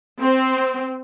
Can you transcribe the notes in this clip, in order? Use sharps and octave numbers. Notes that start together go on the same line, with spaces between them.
C4